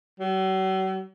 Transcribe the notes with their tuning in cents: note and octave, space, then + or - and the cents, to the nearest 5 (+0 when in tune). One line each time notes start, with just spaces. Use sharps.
F#3 +40